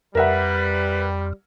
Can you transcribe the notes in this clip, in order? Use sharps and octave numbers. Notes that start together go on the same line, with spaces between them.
F2 G3 A#4 B4 E5 F#5